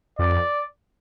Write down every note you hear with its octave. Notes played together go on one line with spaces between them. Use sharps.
F2 D5